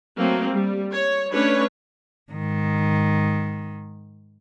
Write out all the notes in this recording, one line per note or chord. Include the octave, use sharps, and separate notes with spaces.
F#3 A3 A#3 C4
G3
C#5
A3 C#4 D4 B4 C#5
G#2 D#3